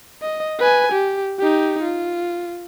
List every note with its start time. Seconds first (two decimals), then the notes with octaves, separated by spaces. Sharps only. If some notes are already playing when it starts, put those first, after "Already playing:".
0.22 D#5
0.60 B4 G#5
0.92 G4
1.39 D#4 G4
1.83 F4